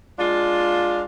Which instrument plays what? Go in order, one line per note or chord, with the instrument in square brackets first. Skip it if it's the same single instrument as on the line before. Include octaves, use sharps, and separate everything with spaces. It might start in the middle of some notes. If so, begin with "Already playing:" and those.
[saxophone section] G#3 D4 F4